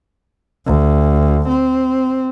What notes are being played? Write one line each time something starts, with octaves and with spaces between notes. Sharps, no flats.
D2
C4